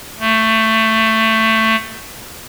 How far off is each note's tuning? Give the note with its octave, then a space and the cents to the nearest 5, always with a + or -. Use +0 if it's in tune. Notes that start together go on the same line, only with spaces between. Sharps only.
A3 +15